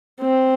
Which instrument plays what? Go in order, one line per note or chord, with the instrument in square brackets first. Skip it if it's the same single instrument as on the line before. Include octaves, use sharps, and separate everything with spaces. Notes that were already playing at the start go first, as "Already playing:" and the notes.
[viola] C4